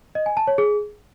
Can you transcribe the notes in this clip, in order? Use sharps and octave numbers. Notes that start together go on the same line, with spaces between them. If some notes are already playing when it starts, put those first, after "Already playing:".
D#5
G#5
A5
C#5
G#4